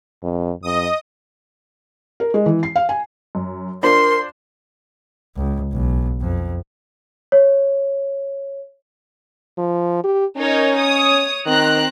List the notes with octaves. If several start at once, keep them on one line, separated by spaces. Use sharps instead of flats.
F2
F2 D#5 D#6
A#4
G#3
E3
C7
F5
G#5
F#2
D4 F4 A#4 C5 C6
C#2
B1
F2
C#5
F3
G4
C#4 D#4 A#4 C#5
C#5 D#6
D#3 C4 A#5 F#6